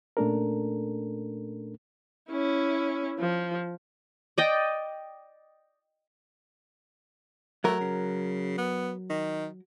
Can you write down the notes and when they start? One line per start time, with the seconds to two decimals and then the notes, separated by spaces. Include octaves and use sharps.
0.17 A#2 A3 C#4 D4 A4 A#4
2.30 C#4 E4
3.19 F3
4.38 D5 D#5 G5
7.64 F#3 A3 A#4
7.80 C#3
8.58 B3
9.10 D#3